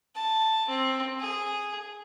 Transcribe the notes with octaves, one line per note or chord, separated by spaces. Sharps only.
A5
C4
G#4